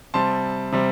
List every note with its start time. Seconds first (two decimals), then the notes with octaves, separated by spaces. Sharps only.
0.14 C3 G3 C4 A5 C6
0.72 C3 G3 C4